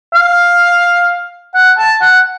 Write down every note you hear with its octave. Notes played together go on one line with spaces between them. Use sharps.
F5
F#5
A5
F#5